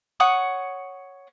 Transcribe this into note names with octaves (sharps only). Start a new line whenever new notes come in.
C#5 F#5 D#6